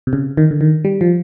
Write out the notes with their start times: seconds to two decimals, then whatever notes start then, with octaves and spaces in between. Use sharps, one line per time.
0.07 C3
0.13 C#3
0.37 D#3
0.51 D3
0.61 D#3
0.85 G3
1.01 F3